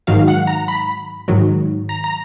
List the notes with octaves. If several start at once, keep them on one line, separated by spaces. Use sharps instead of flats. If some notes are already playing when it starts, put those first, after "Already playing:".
G#2 D#3 F#3 F5
F#5
A#5
B5
G#2 D#3 F#3
A#5
A#5